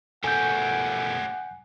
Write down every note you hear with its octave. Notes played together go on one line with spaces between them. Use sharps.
B2 A3 C#4 G4 F#5 G#5 G6